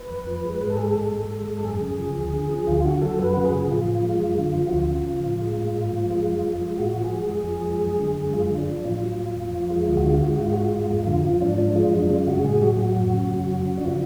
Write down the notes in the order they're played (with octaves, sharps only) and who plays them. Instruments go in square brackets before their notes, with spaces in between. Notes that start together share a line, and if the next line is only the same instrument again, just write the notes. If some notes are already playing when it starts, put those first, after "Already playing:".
Already playing: [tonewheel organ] B4
F2
F3
G#3
G#2 B4
A4
G#3 G#4
A4
G#2
G#2
G#3
G#2
F#2 G#4
C#3
F3
D2
D3
F3
D2 F4
D3 F#4
F#3 A4
F#2 B4
C#3 F#4
G#4
F3
A2 F4
F3
G#3
F#2
D3
F3
F#4
D2 F4
C#3
F3
A2
G#3
A2
G#2
F3
G#3
F#2
F3
G#3
A2 F#4
F3
G#4
G#3
F2 G#4
F3
G#3
F#2
D3
G#3
F#2 F4
D3
D4
F3
A2 F4
F#3
A2
F2
F3
G#3
D2 F4
F#4
D3 F4
F#4
G#3 F4
F#4
G#2 F4
G#3 F#4
F4
G#2
F2 F4
D3 F4
F3 F4
G#2 D4
F3 D4
G#3 F4
F#2 D4
C#3 F4
G#3 F#4
A2 G#4
F#3 F#4
A2 F#4
F#2 F#4
C#3
F#3
F#2
C#3
D4
F3 F4